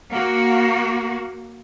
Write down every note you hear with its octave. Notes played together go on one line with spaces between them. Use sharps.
A#3 F#4